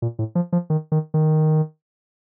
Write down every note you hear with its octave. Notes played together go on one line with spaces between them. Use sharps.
A#2
A2
F3
F3
D#3
D#3
D#3